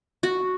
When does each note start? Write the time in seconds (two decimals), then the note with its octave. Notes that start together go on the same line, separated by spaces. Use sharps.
0.23 F#4